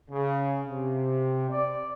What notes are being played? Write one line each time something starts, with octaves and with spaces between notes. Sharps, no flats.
C#3
C3
D5